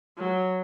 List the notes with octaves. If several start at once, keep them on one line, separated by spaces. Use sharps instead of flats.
F#3